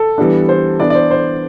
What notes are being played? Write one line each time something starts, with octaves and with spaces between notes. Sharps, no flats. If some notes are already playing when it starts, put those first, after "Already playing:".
Already playing: A4
E3 G3 B3 D4
C5
E3 B3 D4 D5
D5
C5
C5